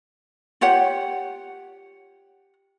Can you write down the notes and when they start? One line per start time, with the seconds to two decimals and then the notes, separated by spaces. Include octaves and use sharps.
0.61 F4 G4 C#5 F#5